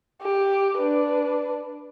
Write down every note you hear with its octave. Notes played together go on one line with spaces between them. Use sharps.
G4
D4 B4